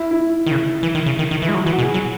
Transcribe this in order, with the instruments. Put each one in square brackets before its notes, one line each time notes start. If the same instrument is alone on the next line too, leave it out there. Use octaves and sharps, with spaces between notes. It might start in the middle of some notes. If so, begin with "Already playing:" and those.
Already playing: [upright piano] E4
E4
[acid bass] D#3
C#3
E3
D#3
C#3
D#3
D#3
E3
[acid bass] G#3 [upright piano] E4
[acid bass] F#3
[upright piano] F#4
[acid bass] E3
[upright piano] F#4
[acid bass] B2 [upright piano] G#4
[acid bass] F#3